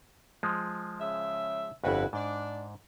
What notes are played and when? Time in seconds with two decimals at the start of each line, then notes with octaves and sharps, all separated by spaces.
0.43 F3 G#3
1.00 C#3 E5
1.84 G1 F2 E4 F#4 B4
2.13 G#2 D4